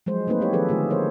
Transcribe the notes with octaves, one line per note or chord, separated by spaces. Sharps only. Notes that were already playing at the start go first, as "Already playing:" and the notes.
F3 F#3 G#3 C5
A3 A#3 C4 D#4 B4 C5
C4 E4 G4 C#5
D#3 F3 C4 G#4 A4 B4
D3 D#3 G#3 A3 F4 G#4
F3 B3 A#4 C5 C#5